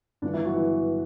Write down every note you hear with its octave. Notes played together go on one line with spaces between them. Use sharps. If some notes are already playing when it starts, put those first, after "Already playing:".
G1 G2 D3 E3 D4
E3 E4
F#3 F#4
E3 E4